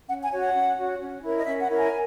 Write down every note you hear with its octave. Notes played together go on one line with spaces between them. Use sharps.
C#4 F#5
G#5
F#4 C#5
F#5
C#4
F#4 C#5
C#4
E4 A#4 C#5
D#5
C#4 E5
F#5
E4 A#4 C#5
G#5